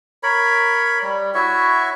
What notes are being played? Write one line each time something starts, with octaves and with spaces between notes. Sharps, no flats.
A#4 C#5 B5
G3
E4 F#4 C#5 E5